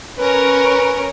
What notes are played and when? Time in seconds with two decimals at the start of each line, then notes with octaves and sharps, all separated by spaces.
0.18 C#4 A#4 B4